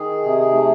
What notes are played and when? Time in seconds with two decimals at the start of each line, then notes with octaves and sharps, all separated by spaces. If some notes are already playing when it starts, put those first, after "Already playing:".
Already playing: D#3 G#4
0.23 C3
0.38 G#4
0.54 A3